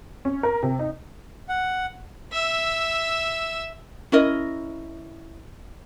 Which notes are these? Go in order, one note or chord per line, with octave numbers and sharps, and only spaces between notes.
C#4
A#4
C3
D#4
F#5
E5 E6
C#4 E4 A#4 D#5